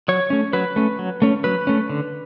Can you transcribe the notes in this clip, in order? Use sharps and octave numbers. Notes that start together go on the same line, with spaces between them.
F#3 C#5
A3 C#4
F#3 B4
A3 C#4
F#3
A3 C#4
F#3 B4
A3 C#4
D3